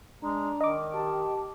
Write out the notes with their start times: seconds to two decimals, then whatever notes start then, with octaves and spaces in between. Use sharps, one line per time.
0.23 G#3 D4 A#5
0.61 D#3 D#5 D6
0.94 G4 A5